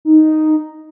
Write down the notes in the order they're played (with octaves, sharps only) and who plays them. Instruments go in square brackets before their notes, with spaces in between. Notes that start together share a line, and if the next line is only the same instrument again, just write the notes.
[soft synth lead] D#4